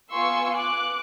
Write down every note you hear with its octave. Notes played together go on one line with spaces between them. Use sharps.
B3 F4 G#5 C6 C#6 E6
D6 F#6